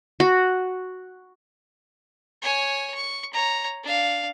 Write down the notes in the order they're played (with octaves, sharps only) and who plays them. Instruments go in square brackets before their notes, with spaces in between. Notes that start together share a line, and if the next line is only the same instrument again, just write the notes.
[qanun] F#4
[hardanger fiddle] C#5 G#5
C#6
C#5 A#5
D4 F5